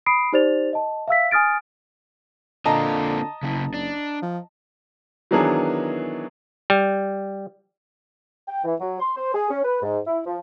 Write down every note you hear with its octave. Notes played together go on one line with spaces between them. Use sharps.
B5 D#6 C7 D7
D#4 G4 C5 D5 A6 F7
D#5 A5
E5 F5 E6 B6
G#5 D#6 F6 A6 D7
D3 A#3 C4 F4 D#5 A5 A#5
F#1 C#3 E4
D4
F3
D#3 E3 F#3 B3 D4 G#4
G3
G5
E3
F#3
C6
C5
G#4
C#4
B4
G#2
E4
F3